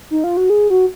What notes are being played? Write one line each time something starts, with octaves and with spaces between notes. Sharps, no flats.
D#4
F4
F#4
G#4
F#4